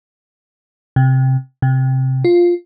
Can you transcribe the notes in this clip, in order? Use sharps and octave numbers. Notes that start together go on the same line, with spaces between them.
C3
C3
F4